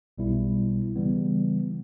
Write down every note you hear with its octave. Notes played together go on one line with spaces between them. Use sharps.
B1 B2 G3 B3 E4
C#3 E3 G3 B3